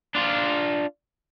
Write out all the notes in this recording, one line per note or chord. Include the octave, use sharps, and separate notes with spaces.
D4 F4